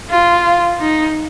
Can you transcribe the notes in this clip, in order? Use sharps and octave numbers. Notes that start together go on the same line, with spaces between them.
F4
D#4